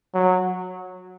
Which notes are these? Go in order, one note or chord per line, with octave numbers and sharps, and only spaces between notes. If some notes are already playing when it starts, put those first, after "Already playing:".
F#3